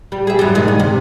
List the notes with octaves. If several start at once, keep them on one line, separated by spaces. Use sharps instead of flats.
G3
G#4 E5
F#2 F#3 G3
G#2 D#3 G#3
G2
C3